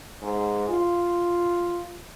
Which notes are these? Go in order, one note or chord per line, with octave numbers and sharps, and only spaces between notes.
G#2
F4